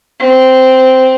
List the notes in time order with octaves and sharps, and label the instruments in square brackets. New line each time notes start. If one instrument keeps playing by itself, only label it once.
[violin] C4